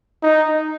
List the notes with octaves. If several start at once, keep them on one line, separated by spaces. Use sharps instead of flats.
D#4